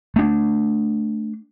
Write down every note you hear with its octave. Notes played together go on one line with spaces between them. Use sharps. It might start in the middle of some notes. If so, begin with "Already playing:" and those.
A3 D4